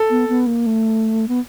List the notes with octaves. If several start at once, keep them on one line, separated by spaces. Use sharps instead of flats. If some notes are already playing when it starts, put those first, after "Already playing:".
Already playing: A4
B3
B3
A#3
A3
B3